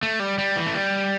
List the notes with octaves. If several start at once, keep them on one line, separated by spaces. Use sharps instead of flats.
A3
G3
G3
E3
A3
G3